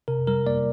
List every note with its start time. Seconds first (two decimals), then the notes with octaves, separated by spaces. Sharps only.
0.08 C3 A#4
0.27 G3 A#4
0.46 A#3 D5